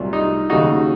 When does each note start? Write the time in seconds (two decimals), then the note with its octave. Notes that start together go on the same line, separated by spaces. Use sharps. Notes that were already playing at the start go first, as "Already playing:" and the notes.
Already playing: C2 A#2 F#3
0.13 D#4
0.50 D#2 C#3 F#3 D#4 F#4